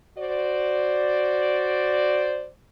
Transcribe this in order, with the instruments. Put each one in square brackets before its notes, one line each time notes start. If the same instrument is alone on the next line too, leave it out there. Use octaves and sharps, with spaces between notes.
[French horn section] F#4 C5 D5